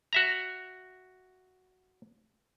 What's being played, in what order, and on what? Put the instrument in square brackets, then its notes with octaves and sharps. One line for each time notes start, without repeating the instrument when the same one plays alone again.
[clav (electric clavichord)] F#4 E5 A#5